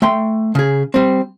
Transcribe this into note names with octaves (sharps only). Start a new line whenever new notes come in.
A3 G5 C6
C#3 G#4
G3 C4